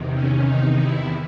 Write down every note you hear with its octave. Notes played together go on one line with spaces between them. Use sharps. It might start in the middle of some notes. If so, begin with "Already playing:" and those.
Already playing: E2 C3 D#3
C#4
D#4
E4